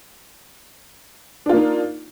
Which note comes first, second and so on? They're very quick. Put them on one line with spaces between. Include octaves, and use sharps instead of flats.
D4 F4 A#3 D#4